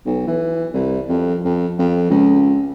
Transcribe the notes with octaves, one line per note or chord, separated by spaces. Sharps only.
B1
E3
C2
F2
F2
F2
C#2